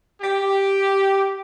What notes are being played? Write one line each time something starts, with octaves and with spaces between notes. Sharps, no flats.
G4